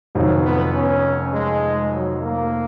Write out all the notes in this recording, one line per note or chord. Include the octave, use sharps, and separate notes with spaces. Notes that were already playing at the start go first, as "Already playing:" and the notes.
F1 F2 D#3 F#3
B3
C#4
G#3
F#3
A#3